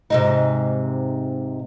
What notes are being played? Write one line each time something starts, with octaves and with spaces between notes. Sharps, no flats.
G#2 C3 D#4